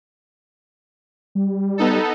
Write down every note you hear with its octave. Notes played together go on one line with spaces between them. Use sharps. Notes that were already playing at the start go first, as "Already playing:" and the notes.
G3
B3 D#4 A4